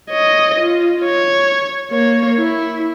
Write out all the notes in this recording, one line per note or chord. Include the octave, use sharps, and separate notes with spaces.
C#5 D#5
F4
C#5
A#3 C#5
E4